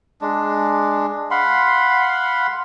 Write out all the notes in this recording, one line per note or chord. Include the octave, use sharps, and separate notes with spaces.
G#3 D4
F5 F#5 B5 C6